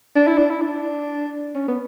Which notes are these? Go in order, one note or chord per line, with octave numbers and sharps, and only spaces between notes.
D4
E4
D4
E4
D4
C#4
B3